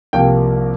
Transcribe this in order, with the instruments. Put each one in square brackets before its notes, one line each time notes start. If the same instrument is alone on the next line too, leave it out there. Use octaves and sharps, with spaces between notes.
[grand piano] C2 C3 F3 A#3 G5